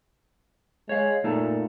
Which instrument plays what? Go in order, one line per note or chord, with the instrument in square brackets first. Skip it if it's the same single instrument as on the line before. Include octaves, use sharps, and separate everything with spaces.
[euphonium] G#3 [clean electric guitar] C#5 F5
[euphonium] A#2 [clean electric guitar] A3 D#4 A4